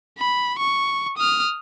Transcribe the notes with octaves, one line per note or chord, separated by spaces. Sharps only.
B5
C#6
D#6 F6